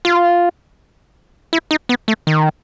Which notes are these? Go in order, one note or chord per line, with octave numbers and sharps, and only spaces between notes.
F4
E4
D#4
B3
A3
D#3